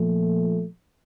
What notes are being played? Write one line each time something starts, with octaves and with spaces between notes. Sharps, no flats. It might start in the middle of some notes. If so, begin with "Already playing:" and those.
Already playing: A#2 F3 A3